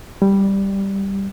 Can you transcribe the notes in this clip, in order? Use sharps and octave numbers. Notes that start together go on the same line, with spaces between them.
G3